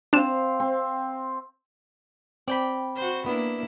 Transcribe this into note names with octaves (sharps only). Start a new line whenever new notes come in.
C4 D4 F5 E7
C4
C4 D5 G5 B5
F#4 C5
A#3 B3 D4 E4